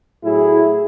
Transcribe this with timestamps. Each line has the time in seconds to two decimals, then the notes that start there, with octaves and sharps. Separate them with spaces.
0.22 A2 F#3 E4 G#4